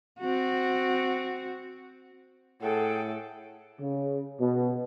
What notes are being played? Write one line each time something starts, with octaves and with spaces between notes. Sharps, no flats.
C4 F#4
A2 G#4 A4 F#5 G5
C#3
B2